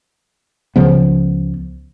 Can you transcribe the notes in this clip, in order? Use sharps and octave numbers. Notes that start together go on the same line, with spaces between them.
C#2 C#3 F3 B3